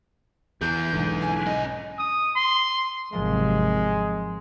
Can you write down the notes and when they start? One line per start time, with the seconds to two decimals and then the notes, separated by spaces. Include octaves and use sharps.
0.61 E2 E3 G#4 G6
0.93 B1 G#2 D3
1.22 G#5
1.47 C#4 D#5
1.99 D#6
2.36 C6
3.13 G#1 C3 F3 F#3 G#3 A#3